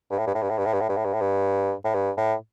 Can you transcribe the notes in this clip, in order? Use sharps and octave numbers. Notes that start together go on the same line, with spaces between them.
G2
A2
G2
A2
G2
A2
G2
A2
G2
A2
G2
A2
G2
A2
G2
A2
G2
A2